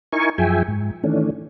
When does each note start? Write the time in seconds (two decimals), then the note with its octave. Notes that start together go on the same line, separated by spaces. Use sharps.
0.12 D#4 E4 A#4 G#5 C#6
0.38 F#2 F3 G#4 E5 G5 G#5
0.68 G#2
1.04 D#3 E3 A3 C#4 D4